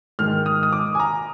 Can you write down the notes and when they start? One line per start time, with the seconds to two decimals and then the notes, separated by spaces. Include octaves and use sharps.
0.19 G#2 D#3 G#3 F6
0.46 D#6
0.63 D#6
0.72 D6
0.95 G#5
1.00 A#5